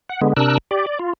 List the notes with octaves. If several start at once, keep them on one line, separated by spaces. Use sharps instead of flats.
F#5
D3 G#3 B3
C3 D4 A#4 E6 F#6
G4 D5
D5
F4